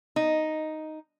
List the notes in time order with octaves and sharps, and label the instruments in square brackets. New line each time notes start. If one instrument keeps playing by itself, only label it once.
[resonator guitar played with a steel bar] D#4